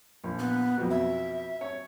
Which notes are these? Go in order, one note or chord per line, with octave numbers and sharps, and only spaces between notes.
A#1
B3
F2 B2
E5
C#5